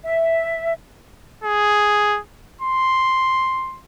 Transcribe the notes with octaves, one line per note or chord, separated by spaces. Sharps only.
E5
G#4
C6